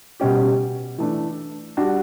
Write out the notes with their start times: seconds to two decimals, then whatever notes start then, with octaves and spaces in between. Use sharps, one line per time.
0.20 B2 G3 C#4 G4
0.98 E3 A3 D4
1.77 G3 D4 F#4